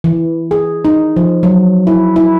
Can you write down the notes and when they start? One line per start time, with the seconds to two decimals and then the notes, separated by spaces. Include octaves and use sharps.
0.04 E3
0.51 G#4
0.85 D#4
1.16 F3
1.43 F#3
1.87 E4
2.16 E4